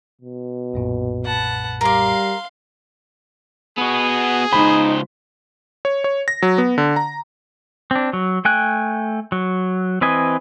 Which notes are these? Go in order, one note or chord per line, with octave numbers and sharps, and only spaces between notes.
B2
B1 F#2 A#2
B4 F#5 A5
G3 A#4 F5 C6 D6
B3 F#4 G#4
C#2 D#4 C5 B5
C#5
C#5
A#6
F#3
B3
D3
A#5
C4 D4
F#3
A3 G5 G#5 F#6
F#3
E3 C4 B4 D#5 G#5